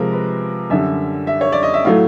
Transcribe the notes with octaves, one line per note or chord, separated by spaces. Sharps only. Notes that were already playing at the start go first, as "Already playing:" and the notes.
Already playing: C3 F3 G#3 A#4
B4
F#2 D3 G3 E5
E5
C#5
D5
D#5
E5
A2 F#3 A3 F5